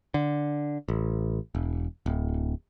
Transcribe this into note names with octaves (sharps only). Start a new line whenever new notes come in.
D3
A1
E1
D1